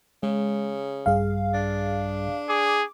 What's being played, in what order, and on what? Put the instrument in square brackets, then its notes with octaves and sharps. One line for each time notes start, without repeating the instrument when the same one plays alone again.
[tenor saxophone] C#3 [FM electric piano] G#3
[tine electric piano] A#1 G2 G3 [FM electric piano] G#4 F5
[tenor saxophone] D4
[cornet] G#4 [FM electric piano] D6